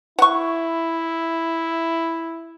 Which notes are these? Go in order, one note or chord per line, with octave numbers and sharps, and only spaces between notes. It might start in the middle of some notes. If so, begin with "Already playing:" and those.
E4 F#5 C#6